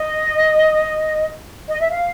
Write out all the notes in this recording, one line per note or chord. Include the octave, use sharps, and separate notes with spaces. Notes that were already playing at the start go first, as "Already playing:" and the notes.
Already playing: D#5
D#5
E5
F5